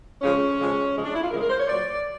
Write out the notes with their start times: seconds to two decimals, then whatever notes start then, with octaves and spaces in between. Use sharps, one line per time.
0.22 F2 C#3 F3 G#3 C#4
0.59 F2 C#3 F3 G#3
0.96 F2 C#3 F3 G#3
1.04 D4
1.14 E4
1.23 F4
1.31 F2 C#3 F3 G#3 A#4
1.41 A#4
1.50 C5
1.59 C#5
1.67 A#2 F#3 D5